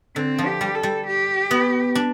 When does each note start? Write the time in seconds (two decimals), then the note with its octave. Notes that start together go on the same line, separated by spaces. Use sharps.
0.16 D3 C4
0.38 F3
0.46 G4
0.61 G3
0.76 A4
0.83 G3
1.06 G4
1.51 B3
1.95 D4